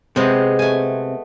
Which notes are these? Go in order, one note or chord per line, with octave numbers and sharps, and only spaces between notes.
C3 G#3 B3 C4
A3 G#5